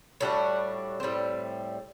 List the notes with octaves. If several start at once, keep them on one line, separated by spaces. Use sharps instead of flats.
A2 G3 D4 F#4
A2 G3 C4